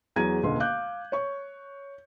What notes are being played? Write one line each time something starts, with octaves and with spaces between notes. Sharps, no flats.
E2 F#3 G#4 A#5 G#6 D#7
E1 C#2 D3 A#3 C6
F5 D6 F#6 G6
C#5 C#6